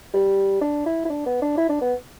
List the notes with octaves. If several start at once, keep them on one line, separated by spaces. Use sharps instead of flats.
G3
D4
E4
E4
D4
B3
D4
E4
D4
B3